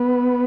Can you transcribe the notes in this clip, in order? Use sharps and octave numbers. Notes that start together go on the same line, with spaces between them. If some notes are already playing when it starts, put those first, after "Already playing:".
Already playing: B3